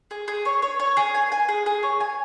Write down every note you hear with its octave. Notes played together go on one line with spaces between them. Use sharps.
G#4
G#4
C#5
C#5
C#5
G#4
G#5
G#5
G#4
G#4
C#5
G#5